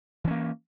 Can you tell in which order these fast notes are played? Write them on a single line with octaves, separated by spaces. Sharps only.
E3 C#4 A#3